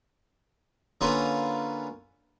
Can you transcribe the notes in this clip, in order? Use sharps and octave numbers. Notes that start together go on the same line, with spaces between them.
D3 A#3 C#4 F4 A#4 B4